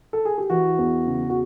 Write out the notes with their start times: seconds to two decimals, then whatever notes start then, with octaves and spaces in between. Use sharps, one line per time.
0.13 A4
0.25 G#4
0.38 G4
0.50 E3 F#4
0.78 E2
1.07 C#3
1.30 F#4